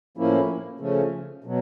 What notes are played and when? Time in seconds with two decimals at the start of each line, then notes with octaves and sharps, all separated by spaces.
0.17 A2 F3 A#3 C#4 E4
0.80 C#3 F3 A3 C#4
1.44 B2 F#3